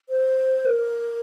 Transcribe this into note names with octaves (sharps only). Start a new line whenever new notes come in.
C5
A#4